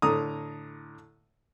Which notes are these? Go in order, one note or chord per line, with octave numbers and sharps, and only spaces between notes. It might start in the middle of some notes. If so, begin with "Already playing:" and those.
A2 D3 A#5 D#6